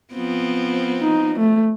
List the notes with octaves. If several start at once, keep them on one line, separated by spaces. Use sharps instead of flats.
F3 B3 C4
D#4
A3